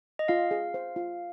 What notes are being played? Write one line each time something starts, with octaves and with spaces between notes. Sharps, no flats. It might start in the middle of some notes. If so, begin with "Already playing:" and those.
D#5
F4 F5
G#4
C5
F4